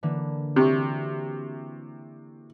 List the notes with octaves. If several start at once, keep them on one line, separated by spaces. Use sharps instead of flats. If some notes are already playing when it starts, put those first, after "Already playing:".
D3 E3 A#3
C3 E4 F#4 C#6